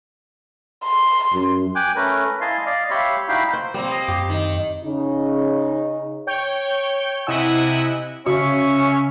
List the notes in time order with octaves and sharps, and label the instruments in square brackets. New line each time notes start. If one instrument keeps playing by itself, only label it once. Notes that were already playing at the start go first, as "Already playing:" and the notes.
[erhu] C6
[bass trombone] F#2
[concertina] G5 G#5 D6 F#6
A3 C#4 A#4 B4
E4 D#5 F5 G#5 A5 C6
D5 D#5 F5
G4 C#5 E5 F5 B5 C6
D#4 E4 F#4 F5 G5 B5
[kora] C5
[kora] G3 C4 [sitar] A#3
[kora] D#5
[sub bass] F#2 [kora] G4
[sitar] D#3
[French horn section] C#3 D#4
[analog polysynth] C#5 G5 G6
C3 E4 D#5 F#5 G#5 E6
[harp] C#3 [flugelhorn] C#4 [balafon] F#4 [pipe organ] E5 C#6